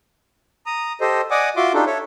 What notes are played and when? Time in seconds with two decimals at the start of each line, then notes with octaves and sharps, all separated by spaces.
0.66 A#5 D#6
1.01 G4 A4 C5 D#5
1.31 D5 D#5 F#5 G#5 D6 D#6
1.56 F4 F#4 E5 C6 D6
1.74 D4 D#4 F4 G4 A4
1.86 A4 C#5 E5